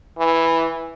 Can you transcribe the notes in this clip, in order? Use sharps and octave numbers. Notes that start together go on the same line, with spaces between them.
E3